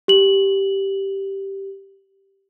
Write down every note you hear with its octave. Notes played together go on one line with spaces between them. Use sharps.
G4 F#7